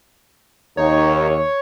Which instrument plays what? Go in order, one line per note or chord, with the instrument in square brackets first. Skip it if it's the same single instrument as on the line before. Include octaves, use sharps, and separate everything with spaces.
[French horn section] D#2 [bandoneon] D#4 [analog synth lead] C#5